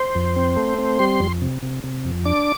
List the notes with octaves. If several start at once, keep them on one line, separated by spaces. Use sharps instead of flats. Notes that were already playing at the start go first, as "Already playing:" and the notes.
Already playing: C5
F2
C4
A3
C4
G3 C6
F2
C3
C3
C3
F2
D4 D6